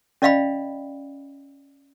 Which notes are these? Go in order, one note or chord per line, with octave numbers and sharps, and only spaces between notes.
C#4 D5 D#5 F5 G5 B5